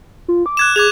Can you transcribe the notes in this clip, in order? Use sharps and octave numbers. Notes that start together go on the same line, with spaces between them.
F4
D6
F#6 G#6 E7
G#4 D6 G#6 F7